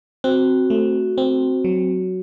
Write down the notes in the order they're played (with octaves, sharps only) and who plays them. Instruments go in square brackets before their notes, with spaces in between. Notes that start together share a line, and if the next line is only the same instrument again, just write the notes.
[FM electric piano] C4 [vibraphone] F#4
[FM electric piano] A3
C4
F#3